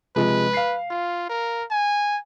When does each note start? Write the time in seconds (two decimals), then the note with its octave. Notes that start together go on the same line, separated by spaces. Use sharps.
0.16 C3 F3 G#3 B4
0.53 F5 C7
0.90 F4
1.30 A#4
1.70 G#5